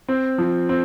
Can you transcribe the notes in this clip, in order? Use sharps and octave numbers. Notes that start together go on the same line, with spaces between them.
C4
F3
C4